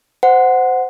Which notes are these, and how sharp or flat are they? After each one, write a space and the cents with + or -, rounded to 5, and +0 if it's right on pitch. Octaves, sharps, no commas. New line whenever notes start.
C5 -15 F#5 +0